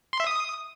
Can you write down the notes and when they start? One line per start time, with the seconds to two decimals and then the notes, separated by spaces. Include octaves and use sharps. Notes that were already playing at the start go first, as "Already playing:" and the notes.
0.13 C6
0.20 E5
0.27 D#6